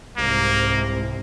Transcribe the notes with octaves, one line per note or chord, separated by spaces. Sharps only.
C2 G#2 C3 A#3